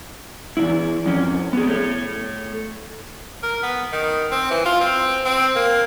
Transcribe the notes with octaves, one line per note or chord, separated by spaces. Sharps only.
E2 G#2 E4
F2 C#4
B3 G#4
A3 C#5
A#4
B3
D#3
C4
E3
F4
C4
C4
A#3